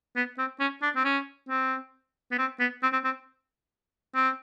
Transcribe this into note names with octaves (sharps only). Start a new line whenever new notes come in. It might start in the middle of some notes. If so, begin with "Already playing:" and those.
B3
C4
C#4
D4
C4
C#4
C4
B3
C4
B3
C4
C4
C4
C4